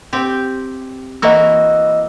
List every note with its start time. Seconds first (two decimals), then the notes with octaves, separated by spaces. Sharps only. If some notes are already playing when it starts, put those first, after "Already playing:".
0.13 C4 G4
1.22 E3 A#3 F#4 D#5 E6